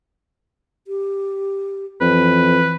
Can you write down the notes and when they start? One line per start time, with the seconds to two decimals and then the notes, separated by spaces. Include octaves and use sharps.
0.87 G4
2.01 F2 E3 B4